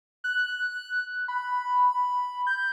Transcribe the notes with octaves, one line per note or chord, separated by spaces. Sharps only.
F#6
B5
G6